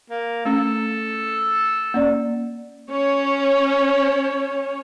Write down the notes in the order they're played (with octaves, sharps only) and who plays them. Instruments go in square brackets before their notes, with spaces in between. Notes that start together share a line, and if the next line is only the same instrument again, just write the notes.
[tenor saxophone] A#3
[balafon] A3 C#4 [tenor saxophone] A4
[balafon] A#3 C#4 D5
[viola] C#4 C#5